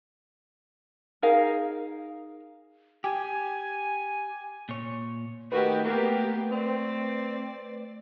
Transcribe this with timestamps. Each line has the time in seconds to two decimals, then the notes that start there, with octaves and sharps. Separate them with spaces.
1.22 D#4 G#4 A#4 F5
3.04 G4 G#5
4.69 A#2 C#5
5.52 D#3 A3 F#4 G4 B4
5.84 A#3 B3 G4
6.51 C4 D5